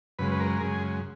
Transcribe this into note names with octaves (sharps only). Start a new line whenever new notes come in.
F#2 C#3 G#3 B4
B4
A#4
F#2 C#3 G#3 G#4